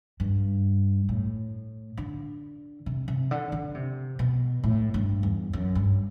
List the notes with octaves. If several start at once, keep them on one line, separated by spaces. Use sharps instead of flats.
G2
A2
D3
C3
C3
D3
D3
C3
B2
A2
G2
E2
F#2
G2